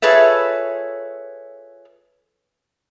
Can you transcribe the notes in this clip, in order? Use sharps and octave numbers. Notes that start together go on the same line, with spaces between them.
F4 G#4 A4 B4 C#5 E5